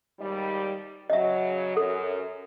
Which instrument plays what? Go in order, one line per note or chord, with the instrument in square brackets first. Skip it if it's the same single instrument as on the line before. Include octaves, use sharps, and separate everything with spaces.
[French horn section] D#2 G#2 G3
[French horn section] C#3 F#3 [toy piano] D#5 E5
[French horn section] F#2 [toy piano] A4